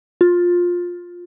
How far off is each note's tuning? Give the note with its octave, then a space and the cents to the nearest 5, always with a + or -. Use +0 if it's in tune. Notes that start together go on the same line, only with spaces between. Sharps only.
F4 +15